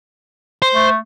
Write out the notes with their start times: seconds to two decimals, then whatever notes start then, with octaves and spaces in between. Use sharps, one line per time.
0.62 C5
0.74 A3